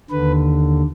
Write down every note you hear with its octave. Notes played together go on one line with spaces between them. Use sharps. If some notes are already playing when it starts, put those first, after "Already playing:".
D#2 D3 B4